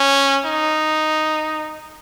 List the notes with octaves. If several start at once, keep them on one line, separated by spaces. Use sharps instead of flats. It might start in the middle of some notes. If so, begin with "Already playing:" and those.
Already playing: C#4
D#4